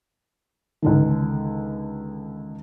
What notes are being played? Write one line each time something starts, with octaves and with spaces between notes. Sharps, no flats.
C#2 D3 D#3